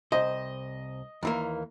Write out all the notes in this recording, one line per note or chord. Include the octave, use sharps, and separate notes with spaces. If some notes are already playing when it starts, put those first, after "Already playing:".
C2 C5 D#5
D#2 E3 A#3